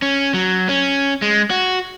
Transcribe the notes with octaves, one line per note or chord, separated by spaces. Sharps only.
C#4
F#3
C#4
G#3
F#4